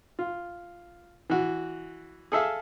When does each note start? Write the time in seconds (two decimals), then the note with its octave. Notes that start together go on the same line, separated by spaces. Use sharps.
0.19 F4
1.30 E3 F#4
2.32 G#4 A4 E5 F5